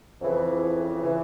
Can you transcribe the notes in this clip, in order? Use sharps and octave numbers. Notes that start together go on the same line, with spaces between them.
F2 C#3 E3
C#3 E3